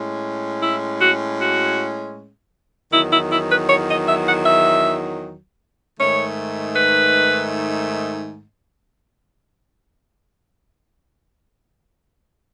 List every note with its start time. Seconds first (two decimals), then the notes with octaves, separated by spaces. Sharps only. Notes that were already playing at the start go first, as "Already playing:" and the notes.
Already playing: A2 G#3 C#4
0.62 E4
1.00 F#4
1.39 F#4
2.91 E2 D#3 F#3 E4
3.11 E4
3.30 E4
3.49 B4
3.68 C#5
3.88 D#5
4.06 E5
4.26 F#5
4.45 E5
5.98 G#2 D#3 A3 C#5
6.75 B4